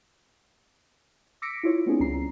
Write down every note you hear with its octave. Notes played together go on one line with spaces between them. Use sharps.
D6 E6 A#6 B6 C#7 D7
E4 F4 C#5
A3 B3 C4 D4 E4 G#4
C#2 G3 C#4 A#5 C7